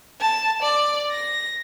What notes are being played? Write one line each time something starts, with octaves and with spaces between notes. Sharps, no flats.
A5
D5
A#6